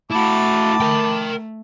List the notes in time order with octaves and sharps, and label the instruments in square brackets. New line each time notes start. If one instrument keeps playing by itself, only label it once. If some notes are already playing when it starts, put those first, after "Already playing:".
[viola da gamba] A3 [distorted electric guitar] E4 F#4 [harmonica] A5 B5 D6
[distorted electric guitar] A#4 G5